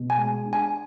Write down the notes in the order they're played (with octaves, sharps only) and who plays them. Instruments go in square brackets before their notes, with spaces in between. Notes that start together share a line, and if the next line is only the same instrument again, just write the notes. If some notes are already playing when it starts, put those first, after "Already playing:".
Already playing: [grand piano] B2
[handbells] G#5
[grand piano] G#3
D4
[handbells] G#5